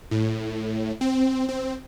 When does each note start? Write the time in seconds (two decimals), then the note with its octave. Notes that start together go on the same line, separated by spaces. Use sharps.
0.11 A2
1.01 C4
1.49 C4